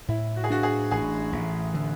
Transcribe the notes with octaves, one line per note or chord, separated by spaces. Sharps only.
A2 E4
F#4
G#4
D4 F#4
G#4
A1 G#4
A1
D3